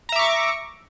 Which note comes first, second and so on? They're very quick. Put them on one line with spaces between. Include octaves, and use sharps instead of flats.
A#5 E5 D6 C#6